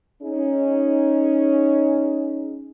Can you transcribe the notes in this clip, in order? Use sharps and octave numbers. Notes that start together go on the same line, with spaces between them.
C#4 D#4 G#4